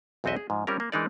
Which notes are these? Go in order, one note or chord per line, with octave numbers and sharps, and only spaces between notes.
B1 E2 C4 F#4 D#5 E5
G#4
G#2 F3
G3 C4 C#4 F4 G4 A#4
A#3
E3 G#3 D4 D#4 A#4 D5